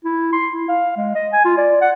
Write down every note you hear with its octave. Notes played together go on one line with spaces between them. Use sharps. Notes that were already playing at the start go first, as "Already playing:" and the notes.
E4
C6
E4
F5
G#3
D#5
G#5
F4
D5
F#5